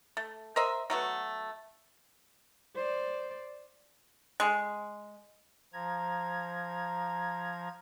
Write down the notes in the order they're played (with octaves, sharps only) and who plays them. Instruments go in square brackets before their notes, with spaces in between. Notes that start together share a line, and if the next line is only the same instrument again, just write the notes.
[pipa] A3
A#4 C5 D#5 E5
F#3 A3 B3 F#4
[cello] C5 D5
[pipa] G#3
[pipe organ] F3 A#5 G#6